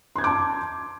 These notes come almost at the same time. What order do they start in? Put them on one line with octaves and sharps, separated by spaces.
C6 G#6 G6 D6 A5